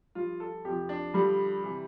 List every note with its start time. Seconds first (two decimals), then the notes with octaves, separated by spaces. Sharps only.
0.15 G2 F3 F4
0.40 A4
0.65 F2 C3 F3 G4
0.89 D4
1.14 G2 D3 F3 G3
1.64 C3 E3